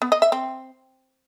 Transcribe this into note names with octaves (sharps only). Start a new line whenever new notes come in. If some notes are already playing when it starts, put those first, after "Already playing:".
B3
D#5
E5
C4